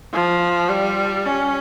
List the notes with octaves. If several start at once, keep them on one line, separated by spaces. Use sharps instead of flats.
F3
G3
C#4